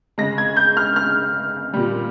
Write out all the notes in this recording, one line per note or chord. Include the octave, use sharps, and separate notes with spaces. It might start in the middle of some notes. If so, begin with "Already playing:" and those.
C#3 G#3 A#6
G#6
G6
F6
F6
A#2 G3